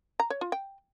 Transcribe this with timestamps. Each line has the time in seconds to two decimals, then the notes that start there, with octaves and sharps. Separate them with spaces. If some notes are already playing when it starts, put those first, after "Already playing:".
0.20 A#5
0.30 C#5
0.41 F4
0.52 G5